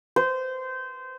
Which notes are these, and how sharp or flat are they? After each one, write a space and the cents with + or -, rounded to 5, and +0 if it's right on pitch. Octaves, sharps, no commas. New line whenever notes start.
C5 -20